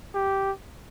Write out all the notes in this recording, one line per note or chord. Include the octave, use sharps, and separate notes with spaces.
G4